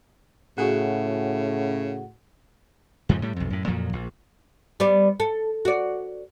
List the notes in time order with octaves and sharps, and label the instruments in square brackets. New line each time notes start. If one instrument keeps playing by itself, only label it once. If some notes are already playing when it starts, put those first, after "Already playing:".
[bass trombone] A2 [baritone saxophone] C#3 [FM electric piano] F#4 G#4 F#5
[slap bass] F2 G#2 C#3 F3
A2 G3
B1 F2
F#2 A2
F2 A#2 F3 F#3
A#1
[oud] G3 B3 D5
A4
F#4 D5